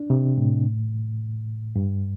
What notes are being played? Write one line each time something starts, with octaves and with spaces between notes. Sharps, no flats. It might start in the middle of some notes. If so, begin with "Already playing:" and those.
Already playing: D4
C3
A2
G2